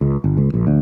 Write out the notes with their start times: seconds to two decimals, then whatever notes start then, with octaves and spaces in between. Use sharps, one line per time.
0.01 C#2
0.24 G1
0.37 C#2
0.54 A#1
0.67 D2